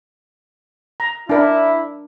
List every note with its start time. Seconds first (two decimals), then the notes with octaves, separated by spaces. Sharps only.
1.00 A#5
1.29 D4 E4 A#4